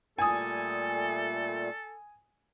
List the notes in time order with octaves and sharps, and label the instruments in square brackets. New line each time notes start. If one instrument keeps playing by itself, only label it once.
[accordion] A#2 G3 A3 [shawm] A4 [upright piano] G#5 D#6